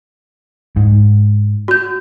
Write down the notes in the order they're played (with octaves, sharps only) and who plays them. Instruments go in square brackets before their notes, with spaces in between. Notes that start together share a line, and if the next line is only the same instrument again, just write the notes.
[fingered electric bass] G#2
[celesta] F#4 G6